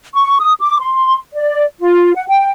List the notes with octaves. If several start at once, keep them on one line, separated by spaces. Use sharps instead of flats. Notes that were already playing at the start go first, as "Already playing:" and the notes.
C#6
D#6
D6
C6
D5
F4
F#5
G5